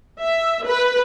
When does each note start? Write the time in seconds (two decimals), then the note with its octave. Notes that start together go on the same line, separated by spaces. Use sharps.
0.20 E5
0.65 B4